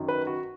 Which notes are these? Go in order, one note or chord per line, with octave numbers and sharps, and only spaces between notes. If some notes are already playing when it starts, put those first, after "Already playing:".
Already playing: F#2 D#3 F#3
B4
F#4